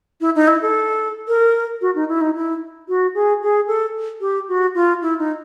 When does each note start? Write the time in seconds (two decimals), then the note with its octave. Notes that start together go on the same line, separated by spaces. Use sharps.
0.21 E4
0.35 D#4
0.48 E4
0.62 A4
1.28 A#4
1.81 F#4
1.95 D#4
2.09 E4
2.21 D#4
2.35 E4
2.89 F#4
3.15 G#4
3.42 G#4
3.68 A4
4.21 G4
4.48 F#4
4.75 F4
5.02 E4
5.19 D#4